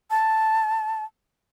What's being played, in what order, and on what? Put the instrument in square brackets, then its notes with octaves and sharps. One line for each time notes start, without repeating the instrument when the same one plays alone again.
[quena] A5